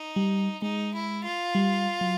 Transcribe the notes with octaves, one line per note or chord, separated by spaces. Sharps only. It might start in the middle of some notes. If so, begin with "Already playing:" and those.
Already playing: D#4
G3
G#3 D#4
E4
F4
G3
F#3